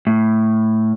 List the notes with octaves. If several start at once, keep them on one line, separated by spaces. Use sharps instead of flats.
A2